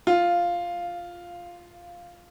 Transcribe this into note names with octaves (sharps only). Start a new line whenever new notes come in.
F4